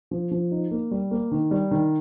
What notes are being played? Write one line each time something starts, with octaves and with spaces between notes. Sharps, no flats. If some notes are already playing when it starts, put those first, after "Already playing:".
F3
F3
D#4
A#3
G3
A#3
D#3
G3
D#3